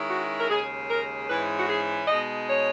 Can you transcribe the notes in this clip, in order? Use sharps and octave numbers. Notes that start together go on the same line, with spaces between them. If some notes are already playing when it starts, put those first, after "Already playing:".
Already playing: D#3 G#3 C#4 E4
F#4
A#4
D#2 C#3 G#3 G#4
A#4
G#2 E3 G#3 C#4 E4 B4
F#4
G#4
B2 G#3 D#4 D#5
C#5